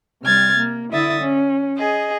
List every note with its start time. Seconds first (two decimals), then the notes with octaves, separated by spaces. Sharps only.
0.23 C3 G3 F6 G#6 A6
0.56 A#3
0.92 D3 E4 E5 D#6 A6
1.21 C#4
1.77 G#4 D#5